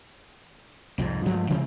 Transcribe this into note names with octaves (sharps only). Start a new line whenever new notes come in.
C2 F2 G#2
G2 F3 G#3 A3
C3 E3 G#3 C4